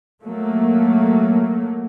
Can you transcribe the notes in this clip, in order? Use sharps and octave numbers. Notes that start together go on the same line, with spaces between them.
F#3 A3 A#3